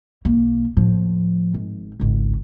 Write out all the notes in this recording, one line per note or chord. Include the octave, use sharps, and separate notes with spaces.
B1 A#3
A2 F3
G#1
G#1 C#2